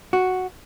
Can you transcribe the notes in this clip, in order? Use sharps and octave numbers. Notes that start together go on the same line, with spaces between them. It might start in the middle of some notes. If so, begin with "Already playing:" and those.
F#4